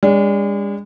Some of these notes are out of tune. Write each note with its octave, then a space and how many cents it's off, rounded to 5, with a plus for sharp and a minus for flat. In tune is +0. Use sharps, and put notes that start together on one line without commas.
G#3 -40 D4 -30